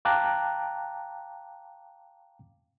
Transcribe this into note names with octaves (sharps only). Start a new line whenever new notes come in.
F5 G5 A5 A#5 D6 F#6